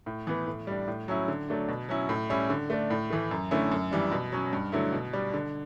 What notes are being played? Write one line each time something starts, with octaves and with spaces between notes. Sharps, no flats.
A2
E3 B3
A2
G3 D4
A2
F#3 C#4 E4
D3
F#3 A3 D4
B2
F#3 C#4 E4
A2
G3 C#4 E4
D3
A3 D4
A2
E3 A3
F#2
D3 A3 C#4 E4
F#2
E3 G3 D4
B2
F#3 C#4
G2
D3 F#3 A3 E4
B2
G3 D4
D3